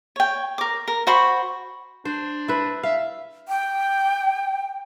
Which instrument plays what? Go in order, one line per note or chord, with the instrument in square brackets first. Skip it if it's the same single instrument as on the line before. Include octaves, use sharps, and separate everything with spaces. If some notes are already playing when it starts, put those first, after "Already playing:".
[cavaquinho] C#5 G5
A#4 D6
A#4
F#4 C5 B5 C#6
[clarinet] D4 [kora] C5
[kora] E4 B4
[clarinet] E5 [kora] F5
[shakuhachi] G5